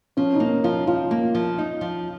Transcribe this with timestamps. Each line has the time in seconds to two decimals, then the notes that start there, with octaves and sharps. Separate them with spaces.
0.17 F3 C#4
0.35 D#4
0.40 A#3 C#4
0.64 F3 F4
0.87 F3 F4
1.11 A#3
1.35 F3
1.58 D#4
1.81 F3